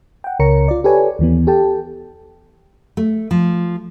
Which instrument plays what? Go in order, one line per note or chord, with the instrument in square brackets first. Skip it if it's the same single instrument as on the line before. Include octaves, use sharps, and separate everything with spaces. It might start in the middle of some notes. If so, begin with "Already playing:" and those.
[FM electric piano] F#5 G5
C#2 C#3 A#4 C#5 A#5 C#7
F4 D5
G4 A4 B4 C#5 D5 G#5
D#2 E3 B3
G4 A4 G5 A5
[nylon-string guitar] A3
F3